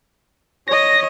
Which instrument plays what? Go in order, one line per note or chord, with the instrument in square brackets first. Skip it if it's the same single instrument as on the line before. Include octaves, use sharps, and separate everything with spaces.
[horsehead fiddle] C#5 D#5 [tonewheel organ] A#6